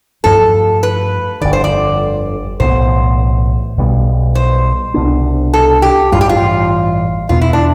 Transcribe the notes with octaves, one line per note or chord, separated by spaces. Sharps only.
G2 F3 A3 A4
B4
G1 F2 D3 D5
C5
D5
B1 A2 E3 B3 C5
B1 B2 G3 B3
C5
C2 B2 B3 D4
A4
G4
A1 G2 E3 G3 F4
G4
F4
E2 B2 B3 F4
E4
D4